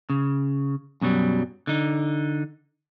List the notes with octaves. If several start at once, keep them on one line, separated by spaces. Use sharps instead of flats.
C#3
F#2 B2 F#3 G3
D3 D#4